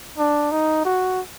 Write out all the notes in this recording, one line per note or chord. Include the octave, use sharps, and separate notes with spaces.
D4
D#4
F#4